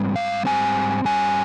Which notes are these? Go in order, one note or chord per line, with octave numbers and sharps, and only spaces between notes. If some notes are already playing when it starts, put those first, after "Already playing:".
Already playing: G#2 G3 C4
F5
G#2 G3 C4 G#5
G2 G3 C#4 G#5